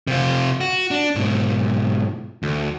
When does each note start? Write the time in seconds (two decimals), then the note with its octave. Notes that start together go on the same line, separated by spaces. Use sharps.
0.07 C3 F4
0.61 F#4
0.91 D4
1.15 G#2 B2
2.43 D2